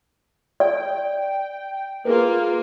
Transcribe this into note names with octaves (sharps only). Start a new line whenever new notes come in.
D5 G5
A#3 F4 G#4 A#4 B4